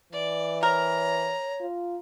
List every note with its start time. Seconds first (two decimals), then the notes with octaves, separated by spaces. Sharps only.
0.13 E3 D5
0.63 A#4 C#5 A#5
1.61 F4